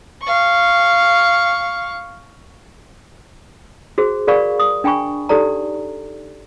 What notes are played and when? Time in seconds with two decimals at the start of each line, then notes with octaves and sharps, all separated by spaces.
0.22 F5 C#6
3.98 F#4 G#4 C5
4.27 G#4 A#4 D5 F5 B5 C#6
4.60 D#6
4.84 D4 G5 G#5 B5 C#6
5.29 D#4 G4 A4 D5 A#5